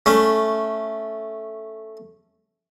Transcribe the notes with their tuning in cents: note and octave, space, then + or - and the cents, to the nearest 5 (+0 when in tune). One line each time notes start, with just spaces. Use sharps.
A3 +0 C#4 +0